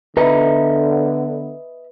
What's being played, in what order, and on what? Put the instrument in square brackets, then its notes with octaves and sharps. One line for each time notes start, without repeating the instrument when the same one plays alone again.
[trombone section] D3 B3 [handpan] B4 [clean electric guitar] D#5 E5 A#5